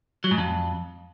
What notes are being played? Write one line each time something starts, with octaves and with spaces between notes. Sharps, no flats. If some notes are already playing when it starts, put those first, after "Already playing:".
F#3
G#2
F2